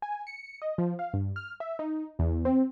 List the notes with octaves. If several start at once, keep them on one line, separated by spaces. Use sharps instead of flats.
G#5
C#7
D#5
F3
F5
G2
F6
E5
D#4
E2
C4